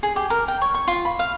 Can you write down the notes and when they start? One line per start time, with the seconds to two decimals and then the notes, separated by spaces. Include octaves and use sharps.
0.03 G#4
0.16 G4
0.30 A#4
0.48 G5
0.62 C#5
0.74 C#6
0.87 F4
1.05 B5
1.19 F5